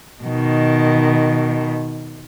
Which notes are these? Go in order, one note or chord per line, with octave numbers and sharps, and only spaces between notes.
B2 D#3